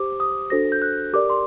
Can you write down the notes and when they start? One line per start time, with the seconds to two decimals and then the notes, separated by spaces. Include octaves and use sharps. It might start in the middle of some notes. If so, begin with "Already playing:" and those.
Already playing: G4 C5 D6
0.20 D#6
0.50 D4 F#4 A4 C5 A#6
0.72 G6
0.82 F#6
1.13 G4 A#4 D5 D6
1.30 C6